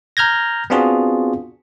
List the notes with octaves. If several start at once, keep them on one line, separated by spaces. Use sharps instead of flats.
A#5 F6 G6 G#6 A#6
B3 C4 D4 F4 F#4 G#4